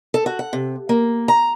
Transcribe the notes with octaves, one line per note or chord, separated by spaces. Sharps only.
A4
F#4
F#5
C3
A#3
A#5